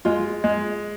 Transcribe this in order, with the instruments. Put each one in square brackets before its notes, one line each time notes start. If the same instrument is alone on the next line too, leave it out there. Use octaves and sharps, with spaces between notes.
[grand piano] G#3 [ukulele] F4
[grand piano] G#3